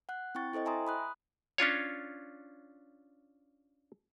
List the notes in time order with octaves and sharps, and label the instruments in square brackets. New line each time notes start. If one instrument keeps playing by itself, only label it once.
[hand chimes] F#5 F#6
C4 E4 G5 C#6 A6
E4 A4 C5 D#5 G5
E5 G#5 A#5 C6 D#6
B5 D#6 F#6
[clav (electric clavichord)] C#4 D4 F4 C#5